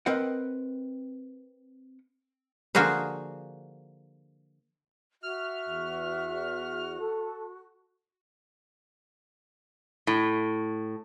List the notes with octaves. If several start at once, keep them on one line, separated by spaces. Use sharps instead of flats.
C4 A#4 B4 D#5 F#5
D3 F3 A#3 F#4 G#4 C5
F#4 E5 F6
E2
A4
A2